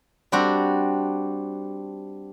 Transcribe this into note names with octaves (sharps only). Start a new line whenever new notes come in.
G3 C4 D4 F#4